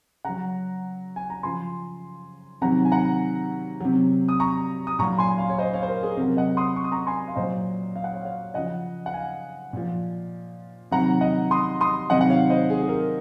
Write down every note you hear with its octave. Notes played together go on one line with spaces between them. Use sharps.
C#3 F#3 F#5 A#5
G#5
A#5
C#3 F3 G#5 C6
C3 D#3 F#3 F#5 A#5
G#5
F#5 A#5
C3 F#3
D#6
A#5 C#6
D#6
A#2 F#3 A#5 C#6
G#5 C6
F5 G#5
C#5
C5 D#5
C#5 F5
C5
A#4
G#4
C3 F#3 A#4
D#5 F#5
C6 D#6
C#6
D#6
A#5 C#6
G#5 C6
F5
A#2 F#3 C5 D#5
F5
F#5
C#5 F5
C#5 F5
C#3 F3 D#5 F#5
F#5
F5 G#5
A#2 F3
C3 D#3 F#3 F#5 A#5
D#5 F#5
C6 D#6
C6 D#6
C3 D#3 F#3 D#5 F#5
F#5
C#5 F5
C5 D#5
G#4
G#4
A#4